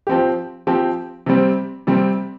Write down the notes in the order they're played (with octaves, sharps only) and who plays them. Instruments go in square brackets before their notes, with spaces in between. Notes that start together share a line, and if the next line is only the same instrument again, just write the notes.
[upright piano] F3 C4 G4
F3 C4 G4
C3 G3 C4
C3 G3 C4